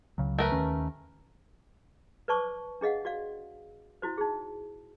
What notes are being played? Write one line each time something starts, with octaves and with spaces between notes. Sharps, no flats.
C#2 C#3 F#3
A3 A#4 B4
D#2 D#3 C#4
B4 C5 D5 A5 C#6 D6
D4 G#4 D#5 F5 F#5
F#4 D5 F5
E4 F#4 C5
D#4 G#4